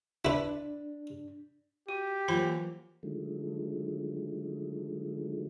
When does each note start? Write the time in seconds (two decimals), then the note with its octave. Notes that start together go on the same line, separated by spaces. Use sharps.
0.25 D4 E4 B4
1.89 F#4 G4
2.28 E3 F#3 A#3 F4 C5 B5
3.03 D3 D#3 F3 F#3 G#3 A3